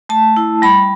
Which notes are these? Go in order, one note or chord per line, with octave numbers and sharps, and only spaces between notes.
A3 A5
E4
G3 B5